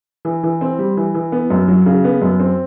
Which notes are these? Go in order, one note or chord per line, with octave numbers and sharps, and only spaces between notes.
E3
E3
C4
G3
E3
E3
B3
F#2
F#3
C#3
B3
F#2
C4